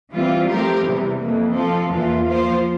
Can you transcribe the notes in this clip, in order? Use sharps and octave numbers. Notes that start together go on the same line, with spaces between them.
E3 G3 C4 F4
F3 A3 C4 G4 A#4
E2 C3 E3 G3
F2 E3 A#3
F3 C4 F4 A4
E2 E3 A#3 F4
F3 A#3 F4 C5